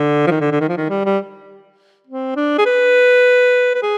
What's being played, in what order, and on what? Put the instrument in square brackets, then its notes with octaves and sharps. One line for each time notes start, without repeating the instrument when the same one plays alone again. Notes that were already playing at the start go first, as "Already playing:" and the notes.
Already playing: [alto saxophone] D3
F3
D#3
D3
D3
D#3
F3
D#3
G3
G3
C4
D4
G#4
B4
B4
G#4